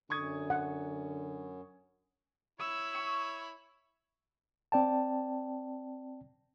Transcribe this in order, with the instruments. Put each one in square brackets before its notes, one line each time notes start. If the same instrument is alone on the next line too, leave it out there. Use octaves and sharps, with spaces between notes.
[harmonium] F#2 [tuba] D3 [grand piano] C#6 D#6 G#6
[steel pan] F#5
[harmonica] E4 C#5 B5 [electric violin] E6
[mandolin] C#6
[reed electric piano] C4 D5 G5 A5